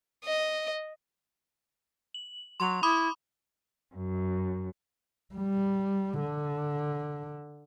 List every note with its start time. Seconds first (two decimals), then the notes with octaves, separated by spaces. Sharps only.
0.25 D#5
2.14 F#7
2.60 F#3 C6 F7
2.83 E4 B5 D6 D#6
3.95 F#2
5.35 G3
6.20 D3